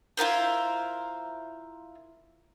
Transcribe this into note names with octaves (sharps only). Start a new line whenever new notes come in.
E4 F4 A#4 C5